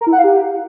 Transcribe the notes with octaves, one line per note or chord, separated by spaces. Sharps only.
A#4
E4
F#5
F5
G4